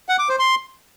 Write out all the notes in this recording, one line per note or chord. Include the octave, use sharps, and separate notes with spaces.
F#5
D6
C5
C6